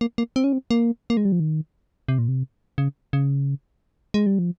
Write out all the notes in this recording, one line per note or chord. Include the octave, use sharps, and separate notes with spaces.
A#3
A#3
C4
C#4
C4
A#3
A#3
G#3
G3
F3
D#3
C3
A#2
C3
C#3
C#3
G#3
G3
F3